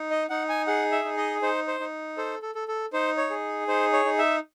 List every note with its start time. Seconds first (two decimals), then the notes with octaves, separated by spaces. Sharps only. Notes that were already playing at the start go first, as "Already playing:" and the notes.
Already playing: D#4
0.11 D#5
0.30 D#4 F#5
0.49 G#5
0.67 G#4 F#5
0.92 E5
1.05 D#4
1.17 D#5
1.42 D#4 C5
1.68 C5
1.80 D#4
2.17 A4 C5
2.42 A4
2.55 A4
2.68 A4
2.93 D#4 C5
3.17 C#5
3.30 G#4
3.68 D#4 C5
3.93 C#5
4.05 D#4
4.18 E5